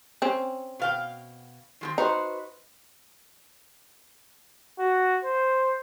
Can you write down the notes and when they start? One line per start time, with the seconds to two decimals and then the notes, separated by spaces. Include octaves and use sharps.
0.22 C4 C#4
0.80 B2 F5 G5
1.81 D#3 G#3 C4
1.98 D#4 F#4 B4 C5
4.79 F#4
5.25 C5